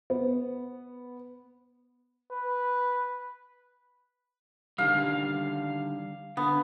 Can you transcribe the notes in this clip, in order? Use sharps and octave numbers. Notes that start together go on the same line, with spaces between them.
B3
B4
D3 D#3 G3 F5
D3 B3